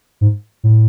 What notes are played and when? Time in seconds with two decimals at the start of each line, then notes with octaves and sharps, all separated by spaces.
0.21 G#2
0.64 A2